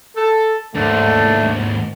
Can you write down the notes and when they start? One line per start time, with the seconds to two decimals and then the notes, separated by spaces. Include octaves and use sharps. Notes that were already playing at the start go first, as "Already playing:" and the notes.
0.16 A4
0.75 D#2 G#2 A3 D4